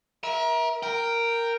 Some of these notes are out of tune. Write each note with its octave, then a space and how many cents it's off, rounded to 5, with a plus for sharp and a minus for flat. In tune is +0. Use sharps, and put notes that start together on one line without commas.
A#4 +30 E5 -20
A#4 -5 G5 +0